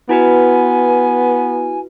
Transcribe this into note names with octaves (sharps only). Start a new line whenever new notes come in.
B3 E4 F#4 B4 G#5